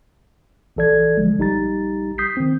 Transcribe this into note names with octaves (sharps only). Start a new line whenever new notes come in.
A#1 E3 A4 D5 G#6
D3 F3 G#3
A#1 G3 D#4 G4 A#5 A6
D#6 G6 B6 C7
D#3 C4